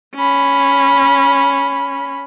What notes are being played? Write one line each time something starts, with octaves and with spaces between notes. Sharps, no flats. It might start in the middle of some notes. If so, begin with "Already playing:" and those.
C#4 B5